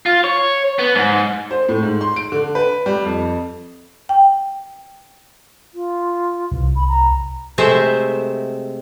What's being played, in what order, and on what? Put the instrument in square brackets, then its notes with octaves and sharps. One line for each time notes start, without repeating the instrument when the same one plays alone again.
[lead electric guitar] F4
C#5
B3
G#2
[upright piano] C5
A2
G#2
C6
D7
D3
B4
G3
F2
[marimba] G5
[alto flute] F4
[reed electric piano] C2
[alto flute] B5
A#5
[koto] C3 G#3 A3 C4 C5 E5